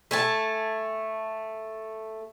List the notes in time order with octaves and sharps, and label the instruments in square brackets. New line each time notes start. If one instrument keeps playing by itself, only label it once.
[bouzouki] A3 G#5 A5